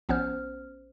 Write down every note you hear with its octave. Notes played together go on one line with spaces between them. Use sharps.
A#1 B3 C#4 C5 F6